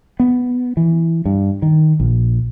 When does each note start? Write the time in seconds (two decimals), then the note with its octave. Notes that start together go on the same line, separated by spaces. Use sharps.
0.20 B3
0.77 E3
1.25 G2
1.62 D#3
2.00 A#1